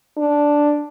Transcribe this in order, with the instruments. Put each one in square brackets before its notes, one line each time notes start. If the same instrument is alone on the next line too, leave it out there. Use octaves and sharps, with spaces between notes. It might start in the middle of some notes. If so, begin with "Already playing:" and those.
[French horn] D4